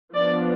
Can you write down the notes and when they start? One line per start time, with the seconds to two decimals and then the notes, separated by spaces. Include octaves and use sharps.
0.14 F3 B3 D4 D5